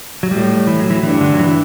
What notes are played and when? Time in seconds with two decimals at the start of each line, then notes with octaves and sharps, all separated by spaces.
0.23 F#3
0.31 A2 G3
0.67 E3
0.80 F#3
0.90 E3
1.03 G2 E3
1.21 D3
1.34 F#3
1.39 E3